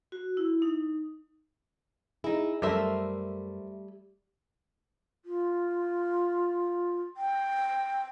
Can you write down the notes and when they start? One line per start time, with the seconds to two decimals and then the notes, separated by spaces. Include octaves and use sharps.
0.12 F#4
0.37 E4
0.62 D#4
2.24 D#4 E4 G#4
2.62 F#2 G3 A3 A#4 C5 E5
5.25 F4
7.17 G5